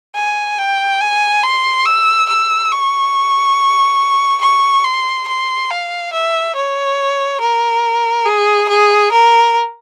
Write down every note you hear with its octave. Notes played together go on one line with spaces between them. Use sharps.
G#5
G5
G#5
C6
E6
E6
C#6
C#6
C6
C6
F5
E5
C#5
A#4
G#4
G#4
A#4